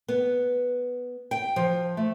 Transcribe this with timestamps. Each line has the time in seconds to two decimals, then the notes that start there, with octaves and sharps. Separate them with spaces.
0.08 B3
1.31 G5
1.56 F3
1.97 A3